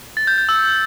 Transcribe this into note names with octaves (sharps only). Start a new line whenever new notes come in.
A6
G6
G6
E6